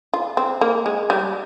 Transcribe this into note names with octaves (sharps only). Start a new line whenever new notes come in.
F4
C4
A#3
G#3
G3